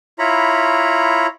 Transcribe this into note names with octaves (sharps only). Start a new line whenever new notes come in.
E4 F4 C#5 A#5 B5